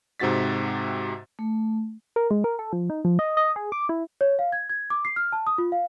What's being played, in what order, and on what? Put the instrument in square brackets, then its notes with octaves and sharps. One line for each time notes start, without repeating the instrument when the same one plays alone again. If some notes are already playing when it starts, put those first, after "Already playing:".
[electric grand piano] G#2 C3 C4 F#4 A6 B6
[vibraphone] A3
[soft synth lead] A#4
G#3
A#4
A4
F3
D#4
F3
D#5
D#5
G#4
D6
E4
[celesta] C#5
F5
G#6
G#6
D6
C7
F6
A5
D#6
F4
F5